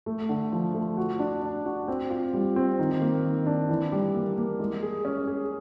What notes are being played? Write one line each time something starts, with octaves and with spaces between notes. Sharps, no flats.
A3
D3
F3
A3
F#4
D4
D4
F#4
C4
F4
G3
C4
D#3
A#3
D#3
D4
E3
G3
A#3
A#3
G#3
G#4
C#4
G#4